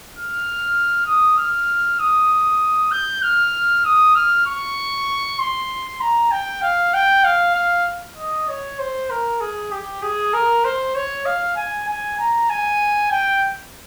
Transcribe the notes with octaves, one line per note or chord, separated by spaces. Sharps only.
F6
D#6
F6
D#6
G6
F6
D#6
F6
C#6
C6
A#5
G5
F5
G5
F5
F5
D#5
C#5
C5
A#4
G#4
G4
G#4
A#4
C5
C#5
F5
G#5
G#5
A#5
G#5
G5